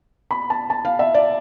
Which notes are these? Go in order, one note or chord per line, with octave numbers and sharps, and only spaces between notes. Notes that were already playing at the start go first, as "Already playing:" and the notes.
B5
A5
A5
F5
E5
D5